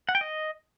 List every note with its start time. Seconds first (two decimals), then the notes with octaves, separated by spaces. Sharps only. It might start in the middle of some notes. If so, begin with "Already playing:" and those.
0.09 F#5
0.15 G5
0.21 D#5